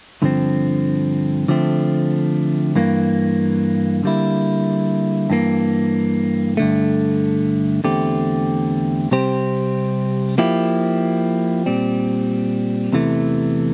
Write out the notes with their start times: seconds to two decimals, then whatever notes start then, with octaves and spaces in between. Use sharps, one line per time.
0.22 G2 D3 F3 C4
1.48 D3 F3 A3 C4
2.76 G2 E3 A#3
4.03 D3 G3 A#3 E4
5.30 G2 E3 A#3
6.57 G2 D3 A3
7.84 E2 D3 A3 C4 G4
9.11 C3 G3 C4 G4 C5
10.38 F3 A#3 E4 G4
11.66 A#2 G3 C4
12.92 E2 C3 E3 A3